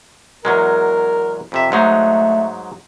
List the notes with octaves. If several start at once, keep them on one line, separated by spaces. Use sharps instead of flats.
E2 F#3 G#3 A#4
F2 C3 E5
G#2 F#3 A3 D#4